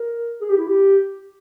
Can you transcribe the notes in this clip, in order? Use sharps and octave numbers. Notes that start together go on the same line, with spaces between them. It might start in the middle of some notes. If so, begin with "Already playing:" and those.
Already playing: A#4
G#4
G4
E4
G4